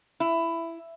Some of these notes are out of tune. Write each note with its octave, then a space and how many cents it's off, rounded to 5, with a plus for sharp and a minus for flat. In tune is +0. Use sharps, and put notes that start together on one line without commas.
E4 +10